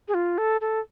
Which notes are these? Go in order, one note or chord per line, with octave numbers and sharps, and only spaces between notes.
G#4
F4
A4
A4